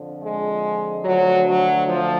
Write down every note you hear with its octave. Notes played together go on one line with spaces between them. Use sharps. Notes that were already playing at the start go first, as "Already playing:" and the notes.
Already playing: F2 D3 F3
G#3
D2 D3 F3 F#3
F#3
F3